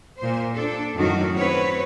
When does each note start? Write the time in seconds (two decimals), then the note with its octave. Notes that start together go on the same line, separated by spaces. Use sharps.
0.18 A#2 C5
0.54 D4 A4
0.95 F#2 A2 D#3 F#3 F#4
1.35 C4 B4 C#5